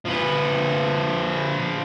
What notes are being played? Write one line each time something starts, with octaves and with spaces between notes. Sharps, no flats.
F3 B4